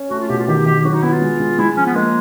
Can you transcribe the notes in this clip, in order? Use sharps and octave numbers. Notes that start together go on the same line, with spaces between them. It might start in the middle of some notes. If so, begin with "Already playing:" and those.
Already playing: C#4
A3 F#4
F4
B2 G4
F4
D#3 G4
D#3 G4
G4
F#3 F#4
D#4
B3 E4
F4
G#3
G#3
G#3 E4
F3 C#4
B3
G#3 A#3